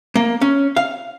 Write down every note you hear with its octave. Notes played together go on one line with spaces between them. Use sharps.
A#3
C#4
F5